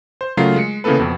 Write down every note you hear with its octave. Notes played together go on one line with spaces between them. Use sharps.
C5
C#3 F#3 A3 F4 A#4 C7
G#3 C#7
C#3 E3 A#3 B3 A4 B4
F2 B2 B3 C4